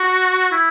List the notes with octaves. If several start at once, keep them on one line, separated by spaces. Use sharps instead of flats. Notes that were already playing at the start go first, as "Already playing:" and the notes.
Already playing: F#4
E4